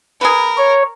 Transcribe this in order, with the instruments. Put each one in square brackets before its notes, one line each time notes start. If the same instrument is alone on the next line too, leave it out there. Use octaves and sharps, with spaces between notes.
[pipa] G#4 B4 [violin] A#4
[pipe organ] C#5